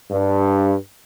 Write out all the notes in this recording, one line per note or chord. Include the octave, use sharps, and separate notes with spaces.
G2